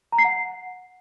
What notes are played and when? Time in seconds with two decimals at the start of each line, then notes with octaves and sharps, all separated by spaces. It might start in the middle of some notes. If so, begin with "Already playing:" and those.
0.12 A#5
0.18 C7
0.25 F#5